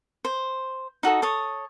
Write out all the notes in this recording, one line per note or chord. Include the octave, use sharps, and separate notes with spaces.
C5
D#4 F#4 A4 D#6
A4 C#5 D#6